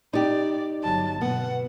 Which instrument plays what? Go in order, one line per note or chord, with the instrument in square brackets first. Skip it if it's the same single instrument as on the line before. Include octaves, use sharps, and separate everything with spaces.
[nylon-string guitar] D#4 G4 [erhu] D5
[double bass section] G1 F#3 [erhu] A5
[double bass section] B2 [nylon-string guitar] B3 [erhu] F#5